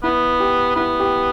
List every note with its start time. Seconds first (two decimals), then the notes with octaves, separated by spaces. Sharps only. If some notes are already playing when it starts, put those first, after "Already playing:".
0.03 B3 E4
0.40 G4
0.76 B3 E4
1.00 G4